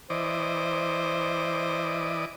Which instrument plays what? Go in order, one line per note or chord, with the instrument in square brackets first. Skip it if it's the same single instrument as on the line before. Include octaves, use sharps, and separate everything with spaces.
[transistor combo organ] E3 D5 D#5 [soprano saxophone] C5